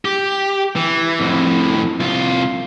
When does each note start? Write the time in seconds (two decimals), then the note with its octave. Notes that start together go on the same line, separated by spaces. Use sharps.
0.05 G4
0.76 E3
1.20 F2 A2
2.00 C2 F4